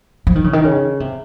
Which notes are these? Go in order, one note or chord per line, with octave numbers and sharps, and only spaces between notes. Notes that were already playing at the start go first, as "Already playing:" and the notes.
F3
D#3
C#3
D#3
C#3
C3